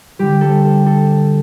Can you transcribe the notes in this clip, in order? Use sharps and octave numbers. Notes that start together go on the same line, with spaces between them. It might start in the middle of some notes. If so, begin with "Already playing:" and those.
D3 G3 G4
A4
A4
A4